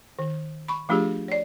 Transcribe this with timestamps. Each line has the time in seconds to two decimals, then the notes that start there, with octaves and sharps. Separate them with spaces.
0.19 D#3
0.68 B5 C#6
0.89 F3 A3 D4 F4 G4 G#4
1.28 C#5 D5